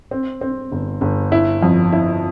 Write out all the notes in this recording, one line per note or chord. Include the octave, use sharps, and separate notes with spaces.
C4
C4
G1
G1
E4
F2
E4